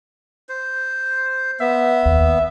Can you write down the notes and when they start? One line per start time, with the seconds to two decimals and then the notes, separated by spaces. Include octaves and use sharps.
0.49 C5
1.60 B3 E5
2.06 D#2